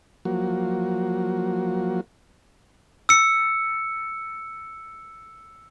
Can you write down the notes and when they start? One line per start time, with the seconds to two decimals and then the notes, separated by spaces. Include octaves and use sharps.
0.25 F3 F#3 A#3 F#4
3.09 E6 C#7